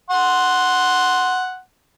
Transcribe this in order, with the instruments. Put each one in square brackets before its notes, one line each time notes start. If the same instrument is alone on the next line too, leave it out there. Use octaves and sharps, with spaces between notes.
[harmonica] F#5 C6